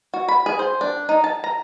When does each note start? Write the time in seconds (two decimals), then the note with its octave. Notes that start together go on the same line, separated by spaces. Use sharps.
0.14 F#4
0.28 B5
0.46 G#4
0.59 C5
0.81 D4
1.09 D#4
1.24 A5
1.44 A#5